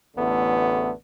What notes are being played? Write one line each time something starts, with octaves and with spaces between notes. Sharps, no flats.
A1 E2 D3 A3 B3